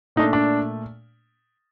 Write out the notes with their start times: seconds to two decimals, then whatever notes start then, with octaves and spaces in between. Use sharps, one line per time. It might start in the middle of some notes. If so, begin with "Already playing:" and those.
0.16 A#2 A3 D4 D#4
0.33 D4